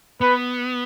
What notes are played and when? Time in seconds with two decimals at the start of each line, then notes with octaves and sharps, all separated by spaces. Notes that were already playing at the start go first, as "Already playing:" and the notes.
0.21 B3 B4